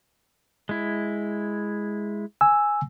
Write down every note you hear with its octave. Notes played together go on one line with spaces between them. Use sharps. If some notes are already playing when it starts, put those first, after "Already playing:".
G#3 E4
G#5 E6